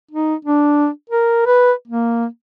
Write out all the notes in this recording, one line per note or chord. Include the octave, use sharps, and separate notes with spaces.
D#4
D4
A#4
B4
A#3